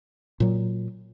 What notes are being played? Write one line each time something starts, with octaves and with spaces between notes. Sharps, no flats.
A#2 F#3